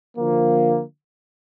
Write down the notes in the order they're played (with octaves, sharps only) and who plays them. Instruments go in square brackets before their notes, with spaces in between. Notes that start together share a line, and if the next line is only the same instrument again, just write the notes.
[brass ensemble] D3 F3 A#3